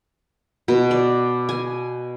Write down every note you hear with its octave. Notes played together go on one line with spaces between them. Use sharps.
B2
D5
G#5